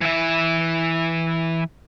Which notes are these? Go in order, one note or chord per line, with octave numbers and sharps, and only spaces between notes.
E3 E5